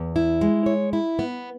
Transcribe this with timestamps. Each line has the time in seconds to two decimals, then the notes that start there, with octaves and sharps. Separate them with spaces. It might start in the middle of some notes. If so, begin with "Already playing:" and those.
Already playing: E2
0.16 E4
0.41 G#3
0.66 C#5
0.93 E4
1.19 B3